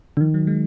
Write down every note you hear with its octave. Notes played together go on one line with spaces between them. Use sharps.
D3
D#3 F3
F#3
G#3